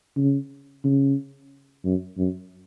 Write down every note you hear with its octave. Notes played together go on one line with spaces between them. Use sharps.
C#3
C#3
F#2
F#2